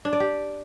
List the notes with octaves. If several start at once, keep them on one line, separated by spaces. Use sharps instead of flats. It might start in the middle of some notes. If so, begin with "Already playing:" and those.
D4
D5
G4